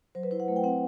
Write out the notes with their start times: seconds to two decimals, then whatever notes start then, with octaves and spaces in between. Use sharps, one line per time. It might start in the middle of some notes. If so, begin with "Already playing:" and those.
0.15 F#3 C5
0.23 B4
0.31 E4 C5
0.40 F#5
0.48 A3
0.56 G5
0.64 C4 F#5